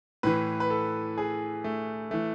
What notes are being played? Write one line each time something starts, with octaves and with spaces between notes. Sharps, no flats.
A2 E3 B4
B4
A4
G#4
A3
E3 A3